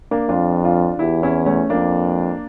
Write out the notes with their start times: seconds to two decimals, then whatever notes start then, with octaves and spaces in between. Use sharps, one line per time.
0.11 A#3 D4
0.29 F2 D4 F4
0.64 D4 F4
0.99 E2 E4 G4
1.23 C#4 E4
1.46 A3 C#4
1.70 F2 A#3 D4